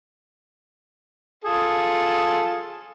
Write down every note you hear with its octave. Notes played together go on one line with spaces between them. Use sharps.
F4 G#4 A4